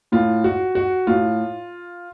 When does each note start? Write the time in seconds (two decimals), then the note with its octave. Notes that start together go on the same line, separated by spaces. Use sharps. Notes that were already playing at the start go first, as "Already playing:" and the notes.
0.12 A2 F4
0.44 F#4
0.75 F#4
1.07 A2 F4